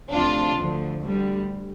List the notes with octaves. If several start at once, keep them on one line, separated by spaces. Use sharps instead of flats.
D2 C3 F3 D4 F4
D2 D3 F3
D2 D3 G3